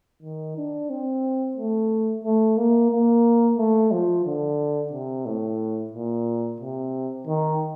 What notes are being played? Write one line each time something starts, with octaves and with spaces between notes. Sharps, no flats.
D#3
D4
C4
A3
A3
A#3
A#3
A3
F3
D3
C3
A2
A#2
C3
D#3